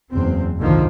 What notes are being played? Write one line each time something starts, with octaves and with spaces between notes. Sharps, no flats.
F#1 E2 C4
F#1 C2 G#2 D3 D#3 F3